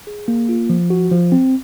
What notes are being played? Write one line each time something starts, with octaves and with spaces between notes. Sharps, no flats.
G#4
A#3
F4
F3
F#4
F3
C4